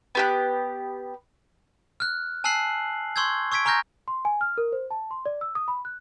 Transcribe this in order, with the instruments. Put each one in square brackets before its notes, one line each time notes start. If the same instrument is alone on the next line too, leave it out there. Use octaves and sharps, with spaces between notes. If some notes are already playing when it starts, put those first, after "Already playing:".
[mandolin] B3 G4 F#6
[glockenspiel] F6 F#6
G#5 A5 E6 F#6 C7 F#7
C6 C#6 E6 G6 G#6
C#6 E6 G#6 B6 D7
G#5 A#5 C#6 F6 G6 A#6
[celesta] C6
G#5
F6
A#4
C5
A5
C6
D5
E6
D#6
B5
F#6